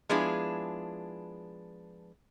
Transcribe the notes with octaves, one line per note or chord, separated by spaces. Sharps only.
F3 G#3 B3 D4 E4 G#4